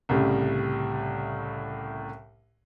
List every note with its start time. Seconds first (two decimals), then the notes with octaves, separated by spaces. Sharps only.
0.09 C2 A2 C#3 G3